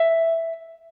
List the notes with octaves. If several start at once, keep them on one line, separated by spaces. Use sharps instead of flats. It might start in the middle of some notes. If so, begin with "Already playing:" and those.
Already playing: E5